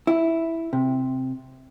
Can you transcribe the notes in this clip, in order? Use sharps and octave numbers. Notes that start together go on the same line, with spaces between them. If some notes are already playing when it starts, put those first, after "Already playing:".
E4
C3